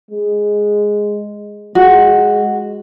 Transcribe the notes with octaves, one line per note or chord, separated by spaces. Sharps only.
G#3
G#3 F#4